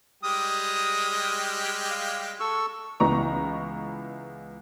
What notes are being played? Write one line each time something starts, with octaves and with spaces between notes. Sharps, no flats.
G3 G#3 G4 D#6
F5
A4 C#6 E6
C#2 E3 B3 A#5 C#6